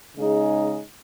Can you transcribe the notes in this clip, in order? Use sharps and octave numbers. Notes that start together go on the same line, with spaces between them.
C#3 G#3 D#4 G#4